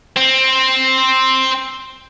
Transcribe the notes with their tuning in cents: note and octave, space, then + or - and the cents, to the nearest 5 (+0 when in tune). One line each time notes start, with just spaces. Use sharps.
C4 +5